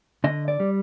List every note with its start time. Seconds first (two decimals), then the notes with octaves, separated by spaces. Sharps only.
0.24 D3 D#5
0.48 D5
0.60 G3